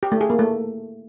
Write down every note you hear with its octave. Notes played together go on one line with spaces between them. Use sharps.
G4
A3
G#4
A#3
A3